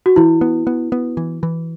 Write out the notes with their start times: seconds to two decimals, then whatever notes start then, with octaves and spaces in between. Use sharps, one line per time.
0.06 F#4
0.16 E3 E4
0.41 B3
0.67 B3
0.92 B3
1.17 E3
1.43 E3